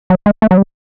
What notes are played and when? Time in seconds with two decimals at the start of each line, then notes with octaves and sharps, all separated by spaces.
0.10 F#3
0.26 G#3
0.42 A3
0.51 F#3
0.57 G3